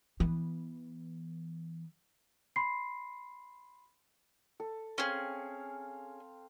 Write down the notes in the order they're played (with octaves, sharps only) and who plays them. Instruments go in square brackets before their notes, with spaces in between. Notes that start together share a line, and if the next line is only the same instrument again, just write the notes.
[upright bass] E3 B3
[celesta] B5 C6 C7
[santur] A4
[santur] C4 C5 F5 [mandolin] C#4 G#4